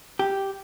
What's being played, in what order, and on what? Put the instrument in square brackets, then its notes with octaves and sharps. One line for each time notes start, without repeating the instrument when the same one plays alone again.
[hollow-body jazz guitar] G4